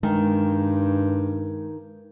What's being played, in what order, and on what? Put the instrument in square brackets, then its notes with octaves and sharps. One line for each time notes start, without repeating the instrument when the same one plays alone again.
[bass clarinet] G2 [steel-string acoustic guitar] D#3 [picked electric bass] G#3